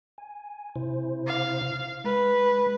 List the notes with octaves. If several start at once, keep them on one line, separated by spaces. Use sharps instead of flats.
G#5
C3 E4 C5
F5
G#3 B4